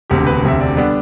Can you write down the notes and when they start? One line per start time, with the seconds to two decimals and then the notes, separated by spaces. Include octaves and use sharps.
0.10 E1 D2 C3 G4
0.27 B4
0.44 E1 D2 C3 E5
0.61 D5
0.77 D3 G3 B3 D4